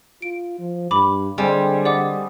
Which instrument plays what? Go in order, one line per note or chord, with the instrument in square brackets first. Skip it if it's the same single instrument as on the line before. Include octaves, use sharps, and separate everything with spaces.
[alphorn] F4 [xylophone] D7
[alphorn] F3
[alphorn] G2 [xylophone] B5 D6
[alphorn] D3 [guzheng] G3 [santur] G#3 C4 G#5
[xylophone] D5 F#5 D6 [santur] D#5